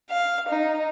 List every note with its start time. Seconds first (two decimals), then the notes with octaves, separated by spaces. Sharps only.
0.10 F5
0.49 D#4